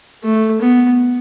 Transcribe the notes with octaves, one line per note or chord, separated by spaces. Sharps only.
A3
B3